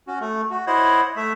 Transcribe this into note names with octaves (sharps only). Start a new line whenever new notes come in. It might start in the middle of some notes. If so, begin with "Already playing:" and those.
C#4 F#4
A3
F#4
E4 C5 C#5 D#5 F#5
A3 E5